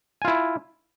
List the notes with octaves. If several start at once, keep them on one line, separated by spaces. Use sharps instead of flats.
E4 F4 G#5